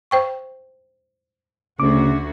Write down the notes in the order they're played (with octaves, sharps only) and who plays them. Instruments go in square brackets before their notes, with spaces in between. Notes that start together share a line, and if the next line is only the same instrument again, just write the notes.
[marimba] C5 G5 C#6
[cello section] D2 F#4 [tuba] C#3 [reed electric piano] D6